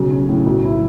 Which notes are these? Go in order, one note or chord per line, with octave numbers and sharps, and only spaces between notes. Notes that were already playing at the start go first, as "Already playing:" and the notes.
Already playing: B1 C#3
C#4
A2
B1
E4